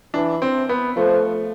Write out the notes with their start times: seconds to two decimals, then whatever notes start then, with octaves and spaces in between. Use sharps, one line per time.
0.14 E3 D4
0.42 C4
0.69 B3
0.96 F3 A3